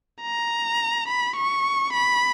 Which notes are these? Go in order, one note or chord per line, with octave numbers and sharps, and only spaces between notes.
A#5
B5
C#6
B5